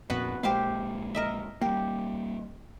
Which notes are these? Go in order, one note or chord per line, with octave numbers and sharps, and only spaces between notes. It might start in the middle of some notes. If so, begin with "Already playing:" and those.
F2 A#2 B3 F#4 B4
A#1 G#3 A#3 G4 C5 F5
A#4 D#5 E5
G3 A#3 G4